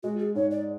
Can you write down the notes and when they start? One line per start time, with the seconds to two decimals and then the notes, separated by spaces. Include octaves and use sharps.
0.03 G#3 F#4
0.19 G#4
0.35 G#2 C#5
0.51 D5